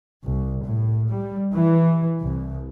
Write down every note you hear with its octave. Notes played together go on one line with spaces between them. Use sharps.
C2
A2
G3
E3
C2